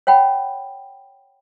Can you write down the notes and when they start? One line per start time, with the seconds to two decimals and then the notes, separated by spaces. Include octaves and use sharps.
0.07 C#5 F#5 G5 B5